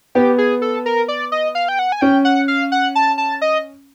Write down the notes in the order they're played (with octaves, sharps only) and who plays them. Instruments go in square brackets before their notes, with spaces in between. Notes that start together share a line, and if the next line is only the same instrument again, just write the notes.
[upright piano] B3 [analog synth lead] G4
[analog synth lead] G#4
A4
A#4
D5
D#5
F5
G5
F#5
G#5
[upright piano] C#4 [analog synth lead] G5
[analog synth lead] F#5
F5
F#5
A5
A5
D#5